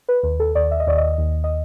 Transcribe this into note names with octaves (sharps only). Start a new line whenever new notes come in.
B4
D#2 B4
A4
D#2 D5
E5
D#5
D#2 D5
D#5
D#2
D#5